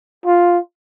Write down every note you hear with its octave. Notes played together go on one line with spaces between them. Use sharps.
F4